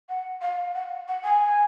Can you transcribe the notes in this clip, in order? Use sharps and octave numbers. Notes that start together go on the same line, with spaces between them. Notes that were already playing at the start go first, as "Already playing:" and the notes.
F#5
F5
F#5
F#5
G#5